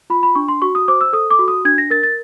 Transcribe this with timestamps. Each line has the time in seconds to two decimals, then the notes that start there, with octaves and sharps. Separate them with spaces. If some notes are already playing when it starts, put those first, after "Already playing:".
0.10 F4 B5
0.23 B5
0.35 D4 C#6
0.48 C6
0.62 F#4 C#6
0.75 D#6
0.88 C5 D6
1.01 E6
1.13 A4 D#6
1.31 D6
1.39 F#4
1.48 D#6
1.65 D4 G#6
1.78 A#6
1.90 A#4 A6
2.03 A6